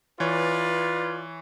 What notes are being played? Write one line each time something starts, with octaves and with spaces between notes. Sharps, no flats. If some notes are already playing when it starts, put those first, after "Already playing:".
E3 F4 B4 C#5 D5